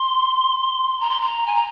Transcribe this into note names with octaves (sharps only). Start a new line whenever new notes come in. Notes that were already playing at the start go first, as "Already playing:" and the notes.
Already playing: C6
A#5
C6
A#5
G#5
A#5